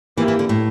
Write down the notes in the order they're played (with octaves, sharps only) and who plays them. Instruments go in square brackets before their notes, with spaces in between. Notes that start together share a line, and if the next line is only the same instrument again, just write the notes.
[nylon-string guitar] E3 [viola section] A#3 E4 G4
[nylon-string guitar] E3
D3
A2